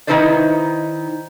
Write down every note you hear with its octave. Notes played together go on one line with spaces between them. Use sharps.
D#3 D#4 E4 B4 C5 D5